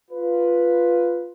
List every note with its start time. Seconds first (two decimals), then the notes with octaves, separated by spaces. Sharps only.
0.11 F4 B4